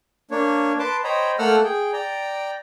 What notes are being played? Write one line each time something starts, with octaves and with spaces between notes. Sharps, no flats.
A#3 D4 C#5
B4 A5 C6 D6
C5 C#5 D#5 G5 A#5 B5
A3 A#3 A4 F#5 E6 F6
G#4 G5
D5 G5 A#5